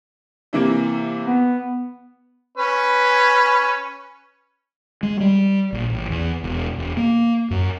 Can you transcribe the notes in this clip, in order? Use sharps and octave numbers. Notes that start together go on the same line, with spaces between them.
C3 E3 A#3
B3
C#4 B4
G#3
G3
A#1
A1
E2
E1
E1
A#3
F#2